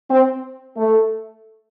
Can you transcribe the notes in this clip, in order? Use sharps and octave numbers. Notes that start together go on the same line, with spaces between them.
C4
A3